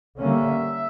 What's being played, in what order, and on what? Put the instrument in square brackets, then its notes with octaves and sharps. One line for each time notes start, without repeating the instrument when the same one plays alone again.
[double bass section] D3 G3 A#3 C#4 [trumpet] E5